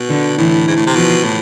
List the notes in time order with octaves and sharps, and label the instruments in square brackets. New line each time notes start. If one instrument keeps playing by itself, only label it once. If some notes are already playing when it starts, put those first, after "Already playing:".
Already playing: [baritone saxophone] B2
[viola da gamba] D3
[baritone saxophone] A2 [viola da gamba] E3
[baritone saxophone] G#2
A2
C3
[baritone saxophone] B2 [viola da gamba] F3
[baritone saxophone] A2